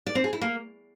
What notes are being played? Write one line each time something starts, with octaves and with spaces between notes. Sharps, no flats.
D5
C4
G#4
E4
A#3